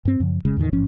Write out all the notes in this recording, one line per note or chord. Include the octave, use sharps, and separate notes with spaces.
G2 C4
F#2 C#3 F3
F1 C#3 G#3
E2 A2 D3 D#3
A1 G#2 F3 C#4